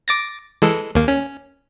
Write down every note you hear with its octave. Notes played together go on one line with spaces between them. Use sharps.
D6 A6 A#6
E3 G#3 A4
D#2 A#3
C#4